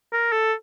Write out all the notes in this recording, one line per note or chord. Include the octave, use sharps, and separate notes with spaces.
A#4
A4